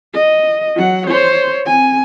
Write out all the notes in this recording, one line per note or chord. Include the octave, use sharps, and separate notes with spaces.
D#5
F#3 F#5
C5 C#5
C4 G#5